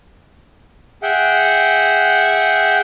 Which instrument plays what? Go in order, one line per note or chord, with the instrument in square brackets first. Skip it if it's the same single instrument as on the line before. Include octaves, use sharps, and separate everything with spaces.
[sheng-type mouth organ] G#4 E5 F#5 G5